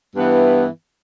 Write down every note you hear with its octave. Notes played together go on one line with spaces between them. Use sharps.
G2 E3 B3 E4